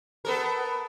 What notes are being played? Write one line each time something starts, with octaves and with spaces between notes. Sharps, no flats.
B3 A4 A#4